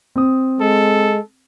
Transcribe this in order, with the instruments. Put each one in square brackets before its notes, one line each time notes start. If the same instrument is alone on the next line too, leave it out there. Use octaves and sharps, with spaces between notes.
[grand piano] C4 D#6
[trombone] G#3 [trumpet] A4